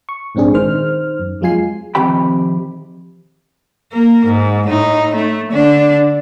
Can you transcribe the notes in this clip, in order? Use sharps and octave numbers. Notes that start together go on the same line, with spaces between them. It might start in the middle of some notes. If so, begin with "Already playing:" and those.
C#6
A#1 G#2 C4 D4 G#4
D#3 C5 F6
F#2
F2 F#3 G#3 F4 G#5 C7
F2 C3 D#3 G4 G5 B5
A#3 A#4
G#2
A2 D#4
A3
D3 D4